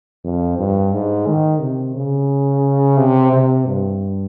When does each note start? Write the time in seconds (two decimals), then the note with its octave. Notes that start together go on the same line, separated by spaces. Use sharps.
0.24 F2
0.59 G2
0.93 G#2
1.28 D#3
1.61 C3
1.96 C#3
2.98 C3
3.33 C3
3.66 G2